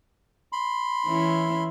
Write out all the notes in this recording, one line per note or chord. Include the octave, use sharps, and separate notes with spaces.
B5 C6
E3 C#4 E4